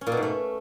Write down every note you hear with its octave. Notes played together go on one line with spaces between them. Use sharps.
C#4
A#2
B2
G#2
A3